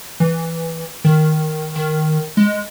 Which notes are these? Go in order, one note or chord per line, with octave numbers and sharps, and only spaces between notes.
E3
D#3
D#3
G#3